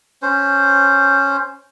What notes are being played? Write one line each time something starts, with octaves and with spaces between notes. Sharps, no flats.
C#4 C5